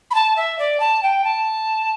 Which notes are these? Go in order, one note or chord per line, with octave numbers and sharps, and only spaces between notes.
B5
A5
E5
D5
A5
G5
A5